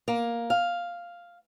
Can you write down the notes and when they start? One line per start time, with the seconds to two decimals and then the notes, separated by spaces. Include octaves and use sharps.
0.08 A#3
0.50 F5